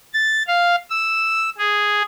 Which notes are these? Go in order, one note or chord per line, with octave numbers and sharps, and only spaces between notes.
A6
F5
E6
G#4